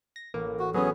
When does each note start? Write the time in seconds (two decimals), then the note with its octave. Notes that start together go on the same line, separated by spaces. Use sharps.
0.16 A#6
0.34 A1 A#3
0.59 F#4
0.74 F#3 B3 C#4 G#4